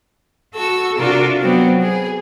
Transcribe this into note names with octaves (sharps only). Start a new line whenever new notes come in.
F#4 A4 C#6 E6
C3 D4 F4 F#4 A#4
F#3 B3 C4 F#4
G#4